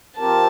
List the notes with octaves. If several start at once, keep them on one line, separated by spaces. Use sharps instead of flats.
F3 C4 G4 A#4 A5